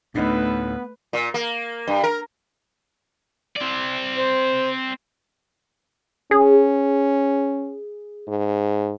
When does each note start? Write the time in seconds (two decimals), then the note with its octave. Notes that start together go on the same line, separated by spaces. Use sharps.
0.15 D2 A2 A3 B3 D4 D#4 B4 D#5
1.13 A#2
1.34 A#3
1.87 G2
2.04 A#4
3.56 C4 D5
4.16 C5
6.31 C#4 G#4
8.28 G#2